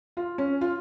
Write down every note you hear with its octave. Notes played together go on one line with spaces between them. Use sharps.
F4
C#4
F4